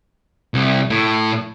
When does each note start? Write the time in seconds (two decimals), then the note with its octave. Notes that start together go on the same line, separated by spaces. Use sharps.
0.54 C2
0.90 A2